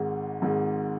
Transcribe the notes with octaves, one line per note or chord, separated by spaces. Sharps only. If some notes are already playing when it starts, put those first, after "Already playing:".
Already playing: G#1 G#2 G#3
G#1 G#2 G#3